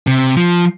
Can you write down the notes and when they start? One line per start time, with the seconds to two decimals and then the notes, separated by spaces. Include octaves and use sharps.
0.07 C3
0.37 F3